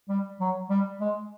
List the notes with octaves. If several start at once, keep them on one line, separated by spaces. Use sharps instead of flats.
G3
F#3
G3
G#3